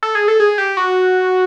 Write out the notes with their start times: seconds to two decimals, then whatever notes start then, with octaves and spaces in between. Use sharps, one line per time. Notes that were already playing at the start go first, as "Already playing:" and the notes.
0.03 A4
0.15 G#4
0.28 A4
0.40 G#4
0.58 G4
0.77 F#4